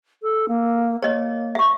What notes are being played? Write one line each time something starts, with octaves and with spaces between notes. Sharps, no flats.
A4
A#3
A#3 C#5 D#5
E5 C#6